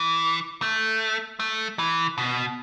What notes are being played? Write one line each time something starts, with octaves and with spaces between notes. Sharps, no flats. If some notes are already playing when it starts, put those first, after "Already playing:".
Already playing: E3
A3
A3
E3
B2